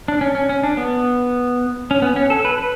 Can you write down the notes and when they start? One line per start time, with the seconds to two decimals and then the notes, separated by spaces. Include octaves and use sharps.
0.08 D4
0.21 C#4
0.35 C#4
0.49 C#4
0.63 D4
0.77 B3
1.91 C#4
2.02 B3
2.16 C#4
2.30 A4
2.45 B4
2.58 B4